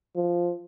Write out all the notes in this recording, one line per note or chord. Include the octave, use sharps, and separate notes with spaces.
F3